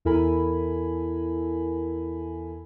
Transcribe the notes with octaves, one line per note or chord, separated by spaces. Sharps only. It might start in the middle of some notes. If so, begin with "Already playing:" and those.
E2 E4 A4 A#4 G#5 B5